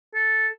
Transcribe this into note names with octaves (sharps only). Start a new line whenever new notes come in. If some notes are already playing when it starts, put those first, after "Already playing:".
A4